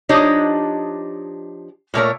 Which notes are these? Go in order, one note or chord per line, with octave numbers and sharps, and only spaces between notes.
F3 D4 D#4 G4 C#5 D#5
A#2 A3 A#4 C#5